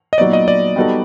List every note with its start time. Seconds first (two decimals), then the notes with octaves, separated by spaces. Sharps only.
0.13 D#5
0.18 A#2 F#3 B3 D#4 D5
0.33 D#5
0.48 D5
0.76 G3 B3 D#4 F#4 A4